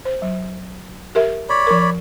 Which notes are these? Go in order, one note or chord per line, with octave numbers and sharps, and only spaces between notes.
C5
F#3
G4 A#4 E5
C#5 D5 B5
F3 A#4